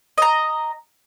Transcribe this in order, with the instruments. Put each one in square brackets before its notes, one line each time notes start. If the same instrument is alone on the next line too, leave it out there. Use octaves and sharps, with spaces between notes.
[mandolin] D#5 A#5